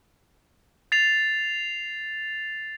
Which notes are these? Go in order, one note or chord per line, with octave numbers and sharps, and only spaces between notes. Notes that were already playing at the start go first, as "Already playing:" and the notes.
A6 C7 F7